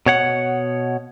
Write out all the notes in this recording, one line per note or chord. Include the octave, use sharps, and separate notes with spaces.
B2 C#5 F#5